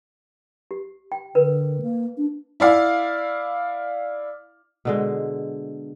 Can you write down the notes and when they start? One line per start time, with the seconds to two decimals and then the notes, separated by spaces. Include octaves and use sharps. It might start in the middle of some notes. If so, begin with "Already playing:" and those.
0.71 G4
1.12 G5
1.35 D3 A#4 B4
1.82 A#3
2.17 D4
2.60 E4 D5 F5
4.85 B2 D3 G#3